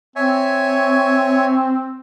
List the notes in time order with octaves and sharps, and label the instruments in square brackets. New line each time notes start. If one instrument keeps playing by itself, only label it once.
[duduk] C4 [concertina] C#5 E5 G#5